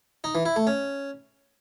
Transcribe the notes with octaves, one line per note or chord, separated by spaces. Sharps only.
D#4
E3
E4
A3
C#4